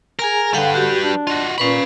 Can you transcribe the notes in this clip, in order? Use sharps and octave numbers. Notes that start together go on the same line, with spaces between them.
G#4 A#4 G#5 A#5
D3 G3 B4 F5 G5
F#4 G4
D4
F4 F#4 D#5
A#2 C#4 B4 F5 B5 C#6